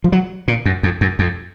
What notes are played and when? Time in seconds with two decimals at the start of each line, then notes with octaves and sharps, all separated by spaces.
0.04 F3
0.12 F#3
0.48 A#2
0.66 F#2
0.83 F2
1.01 F#2
1.19 F2